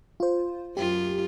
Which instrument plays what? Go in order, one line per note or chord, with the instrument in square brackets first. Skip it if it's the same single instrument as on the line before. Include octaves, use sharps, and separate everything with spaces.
[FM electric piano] F4 C5
[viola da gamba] F#2 F4 [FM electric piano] G4